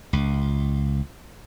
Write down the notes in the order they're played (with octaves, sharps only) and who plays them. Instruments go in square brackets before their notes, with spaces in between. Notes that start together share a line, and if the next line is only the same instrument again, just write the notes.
[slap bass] C#2